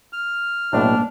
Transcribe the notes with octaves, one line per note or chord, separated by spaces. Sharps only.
F6
B1 A2 A#3 D4